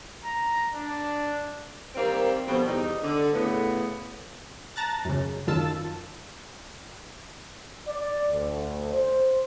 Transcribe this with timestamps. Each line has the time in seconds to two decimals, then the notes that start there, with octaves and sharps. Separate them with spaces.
0.24 A#5
0.73 D4
1.95 D#3 G3 A#3 C4
2.47 B2 D3 F3 G3 C4
2.67 E2 G3 D#4
3.03 D3
3.33 A2 C#3 B3
4.76 A5 A#5 F#6 A6
5.05 F#2 C#3
5.47 F#2 D#3 F4 A5 E6
7.88 D5
8.29 D2
8.92 C5